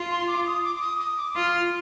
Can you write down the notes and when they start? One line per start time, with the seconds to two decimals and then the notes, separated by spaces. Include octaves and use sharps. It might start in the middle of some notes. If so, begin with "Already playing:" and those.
Already playing: F4
0.11 C6
0.27 D6
0.46 D#6
0.64 D6
0.75 D6
0.81 D#6
1.00 D#6
1.17 D6
1.35 F4 F6